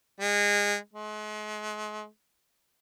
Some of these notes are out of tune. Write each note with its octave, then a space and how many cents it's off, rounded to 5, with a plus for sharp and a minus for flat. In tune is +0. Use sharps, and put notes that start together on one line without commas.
G#3 -25
G#3 +40